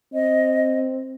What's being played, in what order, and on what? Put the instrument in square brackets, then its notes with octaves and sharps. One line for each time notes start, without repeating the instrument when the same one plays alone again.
[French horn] C4 [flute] D#5